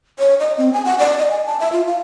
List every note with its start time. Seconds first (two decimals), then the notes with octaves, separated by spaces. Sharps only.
0.19 C#5
0.40 D#5
0.58 C4
0.73 G#5
0.85 F#5
0.99 D5
1.18 D#5
1.30 G#5
1.46 A5
1.60 E5
1.72 F4
1.87 F5